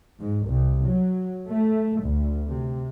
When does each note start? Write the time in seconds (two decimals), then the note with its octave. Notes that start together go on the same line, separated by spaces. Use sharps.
0.21 G#2
0.49 C2
0.88 F#3
1.50 A3
2.05 D2
2.51 C3